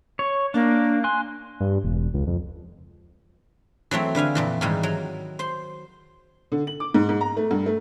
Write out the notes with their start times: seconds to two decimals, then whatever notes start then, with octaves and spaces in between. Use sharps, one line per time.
0.19 C#5
0.54 A#3 D4
1.04 G#5 C6 F#6
1.60 G2
1.84 E1
2.14 C#2
2.27 F2
3.91 E3 F#3 A3 C4
4.15 D3 B4 F5 G#5
4.35 F2 A#2 E3
4.61 G#2 D#3 E3 G3 G#3
4.83 F#3
5.39 C5 C6
6.52 D3
6.67 F#7
6.80 D6
6.94 G#2
7.09 G#2
7.21 A#5
7.37 A3
7.51 G2
7.66 A3